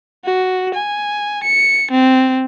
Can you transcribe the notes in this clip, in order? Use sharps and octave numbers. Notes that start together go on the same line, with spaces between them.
F#4
G#5
C#7
C4